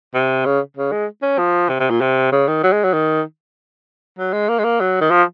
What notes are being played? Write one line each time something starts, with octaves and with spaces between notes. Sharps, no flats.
C3
C#3
C#3
G#3
C#4
F3
C3
C3
A#2
C3
C#3
D#3
F#3
G#3
F#3
D#3
F#3
G#3
A#3
G#3
A#3
F#3
D#3
F3